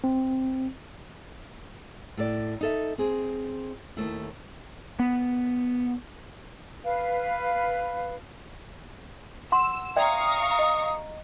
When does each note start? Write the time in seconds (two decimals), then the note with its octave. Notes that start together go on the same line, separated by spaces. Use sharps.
0.04 C4
2.17 A2 A4 D5
2.61 D#4 A4 E5
2.98 C4 G#4
3.97 D#2 G#2 A3 E4
4.99 B3
6.84 B4 F5
9.52 F#5 C6 E6
9.96 D5 E5 F5 G5 A#5 C#6 D#6
10.59 D#5